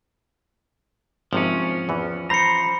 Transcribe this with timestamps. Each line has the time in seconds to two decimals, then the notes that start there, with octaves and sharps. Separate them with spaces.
1.33 G#1 C3 F3 C#4
1.89 E2 E3
2.30 C5 A#5 B5 C#7